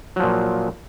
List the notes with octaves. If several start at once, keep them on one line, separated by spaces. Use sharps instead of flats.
A#2 F3 F#3